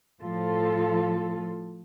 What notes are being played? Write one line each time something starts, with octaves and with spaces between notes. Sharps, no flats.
A2 F3 F4 A4